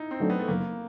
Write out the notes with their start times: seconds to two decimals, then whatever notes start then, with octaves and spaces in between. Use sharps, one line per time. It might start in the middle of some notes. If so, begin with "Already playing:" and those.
Already playing: D#4 E4
0.11 C4
0.20 F#3 A3 D4
0.30 B3
0.39 A3
0.48 F#1 A#3